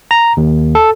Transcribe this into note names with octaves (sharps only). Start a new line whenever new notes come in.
A#5
D#2
A4